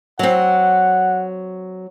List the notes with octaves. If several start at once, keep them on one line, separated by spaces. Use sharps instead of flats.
F#3 C4 F#5